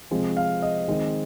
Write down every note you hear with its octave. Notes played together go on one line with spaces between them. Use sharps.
C3 F3 G#3 C4
F5
D#5
D#3 G#3 C4